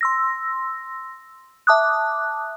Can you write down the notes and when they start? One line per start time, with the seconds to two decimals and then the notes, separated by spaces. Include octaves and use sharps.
0.01 C6 E6 A#6
1.67 E5 A5 D6 D#6 F#6